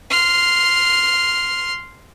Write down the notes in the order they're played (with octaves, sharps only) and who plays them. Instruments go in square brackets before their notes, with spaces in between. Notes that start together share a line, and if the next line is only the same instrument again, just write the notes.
[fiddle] C6 F6